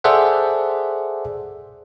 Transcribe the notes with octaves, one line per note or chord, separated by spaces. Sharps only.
G#4 A4 C5 D5 E5 F#5